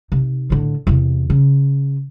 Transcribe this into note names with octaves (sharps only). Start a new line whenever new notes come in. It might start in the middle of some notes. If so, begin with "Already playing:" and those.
C3 D#4
A2 D3
E2 C3
C#3